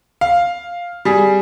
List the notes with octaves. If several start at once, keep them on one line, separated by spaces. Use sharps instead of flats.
F5
G3 G#4